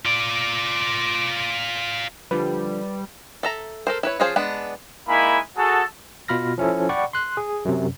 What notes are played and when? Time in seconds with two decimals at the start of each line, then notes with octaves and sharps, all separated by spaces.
0.05 F4 D5
2.31 D3 F3 G3 B4
3.43 A4 E5 A#5
3.87 A4 A#4 C5
4.03 E4 B4 C#5
4.20 F3 C#4 F4 G#4 C5
4.36 G#3 B3 D4
5.09 G#3 A#3 D#4 E4 G#5 B5
5.57 F#4 G#4 A4
6.28 B2 F4 B5 F6 A#6
6.58 F3 C#4 E4 A4
6.89 D5 F#5 G5 B5 C#6
7.13 C6 F#6
7.37 G#4
7.65 F#2 C3